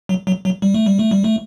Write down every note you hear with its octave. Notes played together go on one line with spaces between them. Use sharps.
F#3
F#3
F#3
G3
A3
G3
A3
G3
A3